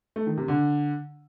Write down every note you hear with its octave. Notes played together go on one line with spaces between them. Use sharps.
A3
D#3
C3
D3